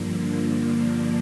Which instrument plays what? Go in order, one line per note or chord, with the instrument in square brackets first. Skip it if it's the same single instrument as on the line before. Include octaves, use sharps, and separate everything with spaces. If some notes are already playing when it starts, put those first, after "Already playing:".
Already playing: [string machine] G2 D3 F3 A#3 D4